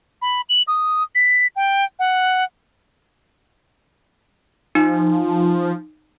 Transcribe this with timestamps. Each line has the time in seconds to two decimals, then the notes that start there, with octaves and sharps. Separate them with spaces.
0.22 B5
0.49 F#7
0.68 D#6
1.15 B6
1.56 G5
1.99 F#5
4.75 F3 D#4